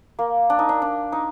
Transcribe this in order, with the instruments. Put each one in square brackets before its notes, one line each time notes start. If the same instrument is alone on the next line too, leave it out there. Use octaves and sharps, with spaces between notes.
[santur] A#3
D4
D#4
D4
D4
D#4